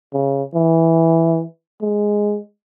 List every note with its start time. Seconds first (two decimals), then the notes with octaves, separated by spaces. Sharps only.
0.14 C#3
0.55 E3
1.81 G#3